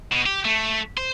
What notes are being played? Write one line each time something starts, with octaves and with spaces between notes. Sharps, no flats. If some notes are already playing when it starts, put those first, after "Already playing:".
B2
G4
A3
C5